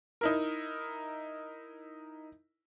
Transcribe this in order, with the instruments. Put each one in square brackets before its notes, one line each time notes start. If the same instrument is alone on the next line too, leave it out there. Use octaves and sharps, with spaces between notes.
[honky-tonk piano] D#4 E4 A#4